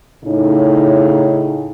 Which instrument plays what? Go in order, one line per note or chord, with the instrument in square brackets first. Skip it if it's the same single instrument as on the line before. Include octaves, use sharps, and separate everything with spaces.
[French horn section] A2 C#3 D#4